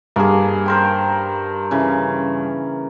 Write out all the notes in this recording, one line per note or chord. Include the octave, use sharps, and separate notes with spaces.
G2 A#3 G#4
A#4 C5 G5
C#3 E3